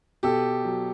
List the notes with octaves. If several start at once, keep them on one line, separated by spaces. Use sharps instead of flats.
B2 G4 A4
F#3